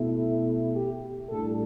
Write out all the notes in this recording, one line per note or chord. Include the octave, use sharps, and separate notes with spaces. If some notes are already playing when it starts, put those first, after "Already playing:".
Already playing: B2 A3 E4
G4
A2 G3 D4 A4